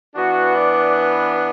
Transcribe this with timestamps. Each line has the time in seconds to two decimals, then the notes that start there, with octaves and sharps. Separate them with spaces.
0.15 E3 B3 D4 F#4
0.55 D5